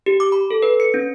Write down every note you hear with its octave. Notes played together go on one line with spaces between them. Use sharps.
G4
D6
B5
A4
B4
C#7
C#4